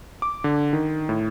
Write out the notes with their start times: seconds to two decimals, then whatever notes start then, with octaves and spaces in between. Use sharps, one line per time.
0.22 D6
0.44 D3
0.73 D#3
1.09 A2